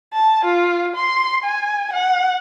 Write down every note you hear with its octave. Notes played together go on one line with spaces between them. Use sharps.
A5
F4
C6
G#5
F#5